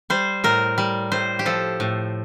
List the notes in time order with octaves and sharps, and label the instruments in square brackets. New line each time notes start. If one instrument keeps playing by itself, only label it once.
[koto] G3 C5
A2 A#4
G3
A2 C5
G4
F3 A4
A2